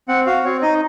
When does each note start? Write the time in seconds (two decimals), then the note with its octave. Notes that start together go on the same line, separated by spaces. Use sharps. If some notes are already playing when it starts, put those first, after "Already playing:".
0.08 C4 F#5
0.26 F#4 F5
0.44 C4 C#5
0.62 D#4 D#5